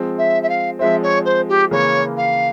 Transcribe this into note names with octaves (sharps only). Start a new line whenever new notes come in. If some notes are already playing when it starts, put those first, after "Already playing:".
Already playing: F3 G#3 C4
E5
E5
F5
F3 G#3 C4 E5
C#5
C5
G4
C#3 E3 A#3 C#5
F5